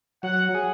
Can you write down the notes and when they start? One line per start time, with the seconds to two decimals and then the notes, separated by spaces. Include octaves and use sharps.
0.23 F#3 F#5
0.55 G#4